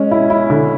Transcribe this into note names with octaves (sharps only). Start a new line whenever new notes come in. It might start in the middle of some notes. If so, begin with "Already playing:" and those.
Already playing: G#3 C#4
E4
E4
D3